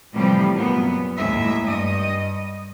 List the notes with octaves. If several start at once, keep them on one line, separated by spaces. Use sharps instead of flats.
A2 C3 E3 F3 G3 G4
F#2 A#2 B3
D#2 A2 G#3 E5
G2 D#5